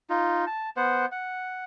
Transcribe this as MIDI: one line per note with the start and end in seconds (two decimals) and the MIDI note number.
0.10 0.45 63
0.10 0.45 65
0.47 0.69 81
0.77 1.06 59
0.77 1.06 72
0.77 1.06 78
1.12 1.64 78